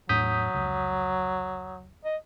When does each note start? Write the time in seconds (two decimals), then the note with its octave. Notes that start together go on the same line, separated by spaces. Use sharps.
0.09 E2 A2 F#3 D4 D#6 G6 B6
0.54 F1 C#2
2.04 D#5